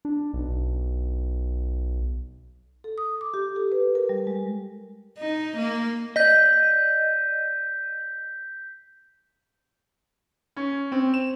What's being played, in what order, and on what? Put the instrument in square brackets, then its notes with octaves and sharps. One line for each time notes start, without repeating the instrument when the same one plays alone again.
[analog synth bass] D4
B1
[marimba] A4
D#6
D6
G4
A4
B4
A#4
G3
G#3
[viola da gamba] D#4
A#3
[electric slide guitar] D5 D#5 [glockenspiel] G6 B6
[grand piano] C#4
C4
E7